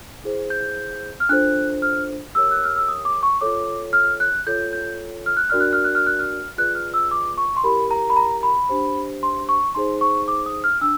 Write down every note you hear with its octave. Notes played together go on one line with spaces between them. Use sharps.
E4 G#4 C5
G6
F6
D4 F4 A4 C5 F#6
F6
G4 A#4 C#5 E6
F#6
F6
E6
D#6
D6
C#6
F4 A4 C#5 D6
F6
F#6
F4 A4 C#5 G6
G6
F6
F#6
D4 F#4 A#4 D5 F6
F#6
F6
F#6
F6
F#6
F6
F4 G#4 B4 D5 F#6
F6
E6
D6
C#6
C6
E4 G4 A#4 B5
A#5
B5
A#5
B5
D4 G4 C5
C6
C#6
D#4 G#4 C5 C6
C#6
D6
D#6
F6
D4 E6